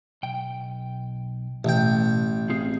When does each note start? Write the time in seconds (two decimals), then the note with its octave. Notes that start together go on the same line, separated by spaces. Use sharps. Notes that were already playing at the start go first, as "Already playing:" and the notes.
0.23 B1 G5
1.65 A1 B2 G5
2.50 C4 F4 G#4